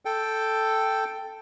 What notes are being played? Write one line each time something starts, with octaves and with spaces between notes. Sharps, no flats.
A4 G5